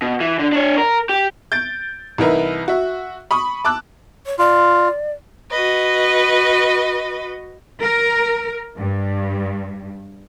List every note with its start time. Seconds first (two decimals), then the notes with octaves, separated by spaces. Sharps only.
0.02 B2
0.20 E3
0.39 D3
0.52 D4 C#5
0.78 A#4
1.09 G4
1.52 G6 A6 D7
2.18 C2 E3 D#4 A#4 B4 E5
2.68 F#4 E5
3.31 B5 C#6 D#6
3.65 A5 D6 E6 F#6
4.26 C#5
4.39 F4 D5
5.50 F#4 B4 D#5
7.81 A#4
8.78 G2